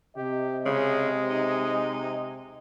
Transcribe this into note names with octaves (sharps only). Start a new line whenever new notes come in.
C3 G4 D#5
C#3 G#3
D#4